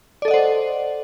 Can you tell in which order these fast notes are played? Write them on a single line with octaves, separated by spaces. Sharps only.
D5 A4 D#5 F#5 C5